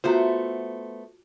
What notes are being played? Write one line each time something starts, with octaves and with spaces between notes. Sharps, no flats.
A3 B3 F4 F#4 C5 A#5